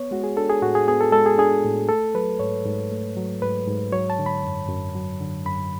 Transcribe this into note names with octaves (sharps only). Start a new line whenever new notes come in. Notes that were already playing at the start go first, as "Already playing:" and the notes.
Already playing: B3 C#5
G#3 F#4
G#4
D4 A4
G#4
A2 F#4
G#4
B3 G#4
A4
G#3 A4
G#4
D4 G#4
A2
A3 A4
F#3 B4
G#2 C#5
G#2
A3
F#3
G#2 B4
G#2
F#3 C#5
A5
D3
B5
F#2
F#2
F#3
D3
F#2 B5